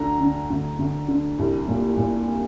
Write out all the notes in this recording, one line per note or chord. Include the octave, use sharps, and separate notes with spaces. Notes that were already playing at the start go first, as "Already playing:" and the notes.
Already playing: D2 D3 A#5
D3
D2
D2
D3
C2
A#2
A#2